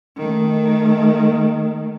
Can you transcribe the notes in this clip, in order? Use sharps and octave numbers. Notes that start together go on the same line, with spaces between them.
D#3 A3